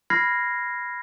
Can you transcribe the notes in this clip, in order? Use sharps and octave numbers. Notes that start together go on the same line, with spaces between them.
B5 F6 G#6 A#6 C7